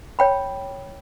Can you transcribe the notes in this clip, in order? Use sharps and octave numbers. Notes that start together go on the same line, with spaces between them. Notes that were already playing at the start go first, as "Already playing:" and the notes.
C#5 G5 B5